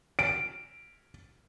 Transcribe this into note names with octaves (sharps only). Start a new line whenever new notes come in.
D7